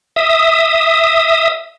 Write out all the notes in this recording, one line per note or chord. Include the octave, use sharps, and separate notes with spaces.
E5 D#6